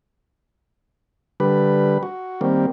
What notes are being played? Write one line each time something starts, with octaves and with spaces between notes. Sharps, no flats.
D3 G3 B4
F#4
D#3 G3 A#3 C4